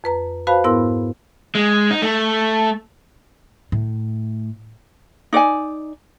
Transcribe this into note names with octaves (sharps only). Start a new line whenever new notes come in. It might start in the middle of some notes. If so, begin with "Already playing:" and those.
F2 B4 A#5
F#4 B4 C5 F5 A5 B5
G#2 B3 E4 A#4 C6 E6
G#3
D#4
A3
A2
D#4 D5 F5 G#5